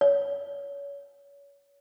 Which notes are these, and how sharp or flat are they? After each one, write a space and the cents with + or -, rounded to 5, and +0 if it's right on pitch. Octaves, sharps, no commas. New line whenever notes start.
C#5 +30